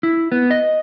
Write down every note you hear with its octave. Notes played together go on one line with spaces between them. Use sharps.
E4
B3
D#5